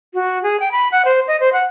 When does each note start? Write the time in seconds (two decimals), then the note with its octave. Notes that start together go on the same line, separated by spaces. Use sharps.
0.14 F#4
0.43 G#4
0.60 G5
0.72 B5
0.92 F#5
1.05 C5
1.28 D#5
1.40 C5
1.53 F#5